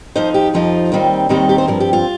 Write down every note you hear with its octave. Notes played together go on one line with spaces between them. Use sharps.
F2 F3 D#4 C5
G4
F2 F3 D#4 F4
D#2 D#3 G3 C4 D#4
D#2 D#3 G3 C4 D#4 G4
G4
C5
G2 F3 C4 A#4
G4
F4